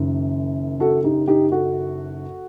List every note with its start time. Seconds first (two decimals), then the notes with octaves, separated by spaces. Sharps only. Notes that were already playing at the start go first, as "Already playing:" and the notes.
Already playing: F#1 F#2 D#3
0.80 F#4 A4
1.04 D#4 G4
1.28 D#4 G4
1.52 F#4 A4